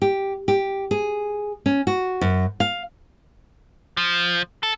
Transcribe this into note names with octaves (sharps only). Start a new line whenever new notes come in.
G4
G4
G#4
C#4
F#4
F#2
F5
F3
A4